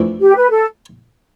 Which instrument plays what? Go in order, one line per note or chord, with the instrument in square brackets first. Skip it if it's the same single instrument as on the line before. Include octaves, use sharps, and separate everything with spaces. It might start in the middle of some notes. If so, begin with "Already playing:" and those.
Already playing: [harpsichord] F2 E3 A3 D4
[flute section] G4
B4
A4